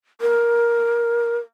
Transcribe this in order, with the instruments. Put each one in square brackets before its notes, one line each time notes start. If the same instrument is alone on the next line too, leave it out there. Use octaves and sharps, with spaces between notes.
[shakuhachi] A#4